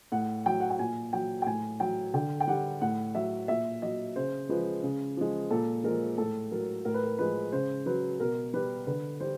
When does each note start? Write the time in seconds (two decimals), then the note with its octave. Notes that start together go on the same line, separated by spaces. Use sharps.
0.12 A2 F#5
0.46 F#3 G5
0.60 F#5
0.70 G5
0.79 A#2 G#5
1.13 F#3 G5
1.42 G5
1.46 A2 G#5
1.80 F#3 G5
2.14 D3 G5
2.40 G5
2.47 G3 F#5
2.81 A2 F#5
3.15 F#3 E5
3.48 A#2 E5
3.82 F#3 D#5
4.16 C#3 C5
4.49 F3 G#3 B4
4.83 C#3
5.17 F3 G#3
5.50 A#2 A4
5.84 F3 G#3 A#4
6.18 A2 A4
6.51 F#3 A#4
6.85 A2 A#4
6.94 B4
7.03 A#4
7.19 F3 G#3 B4
7.52 C#3 C5
7.86 F#3 B4
8.20 B2 A#4
8.54 G3 B4
8.87 D3 B4
9.20 G3 C5